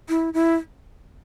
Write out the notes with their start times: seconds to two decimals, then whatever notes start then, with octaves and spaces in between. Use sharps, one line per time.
0.09 E4
0.34 E4